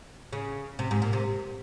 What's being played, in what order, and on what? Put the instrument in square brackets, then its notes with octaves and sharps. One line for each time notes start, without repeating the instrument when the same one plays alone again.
[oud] C#3
C3
G#2
A#2
C3